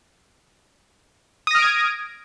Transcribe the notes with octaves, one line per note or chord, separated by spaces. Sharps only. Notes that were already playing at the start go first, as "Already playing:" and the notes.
D#6 F6 G#6 A#6 D7